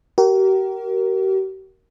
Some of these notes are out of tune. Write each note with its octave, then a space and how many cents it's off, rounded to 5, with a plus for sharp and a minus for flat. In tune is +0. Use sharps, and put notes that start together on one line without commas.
G4 -45 A#4 +0